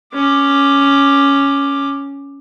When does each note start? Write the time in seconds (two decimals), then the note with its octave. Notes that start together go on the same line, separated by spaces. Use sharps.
0.14 C#4 D6